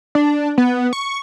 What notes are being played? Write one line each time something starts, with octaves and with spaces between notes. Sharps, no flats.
D4
B3
C#6